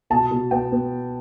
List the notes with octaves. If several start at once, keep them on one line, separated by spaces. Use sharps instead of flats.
B2 A5
B2
B3 G5
B3